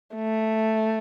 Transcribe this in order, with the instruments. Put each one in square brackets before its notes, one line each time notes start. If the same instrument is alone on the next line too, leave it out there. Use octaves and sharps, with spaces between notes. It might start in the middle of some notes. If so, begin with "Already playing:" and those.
[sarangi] A3